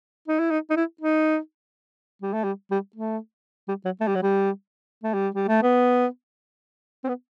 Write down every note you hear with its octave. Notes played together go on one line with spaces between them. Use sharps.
D#4
E4
D#4
D#4
E4
D#4
G3
A3
G3
G3
A3
G3
F#3
A3
G3
F#3
G3
A3
G3
G3
A3
B3
C4
B3